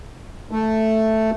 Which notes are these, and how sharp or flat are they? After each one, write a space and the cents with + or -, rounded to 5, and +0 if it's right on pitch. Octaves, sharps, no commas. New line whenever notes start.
A3 +0